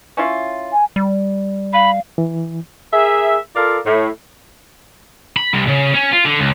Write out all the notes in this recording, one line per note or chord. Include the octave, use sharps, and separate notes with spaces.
C#4 E4 F4
G#5
G3
F5 B5
E3
G#4 A#4 E5
F4 A4 A#4 D5 F5
A2
B5
C2
C#3
C#4
F4
D3
C#2